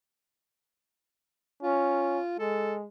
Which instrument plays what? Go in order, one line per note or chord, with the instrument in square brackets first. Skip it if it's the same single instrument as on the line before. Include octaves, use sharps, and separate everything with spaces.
[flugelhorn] C#4 [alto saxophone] F4
[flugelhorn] G#3 [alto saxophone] A4